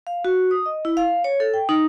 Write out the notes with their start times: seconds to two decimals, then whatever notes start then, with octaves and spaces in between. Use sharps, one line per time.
0.07 F5
0.25 F#4
0.51 D#6
0.66 D#5
0.85 E4
0.97 F5
1.24 C#5
1.40 A4
1.54 G5
1.69 D#4